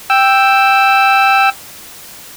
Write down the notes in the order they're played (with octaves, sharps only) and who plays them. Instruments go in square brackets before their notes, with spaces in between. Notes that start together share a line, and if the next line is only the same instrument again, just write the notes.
[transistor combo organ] G5 E6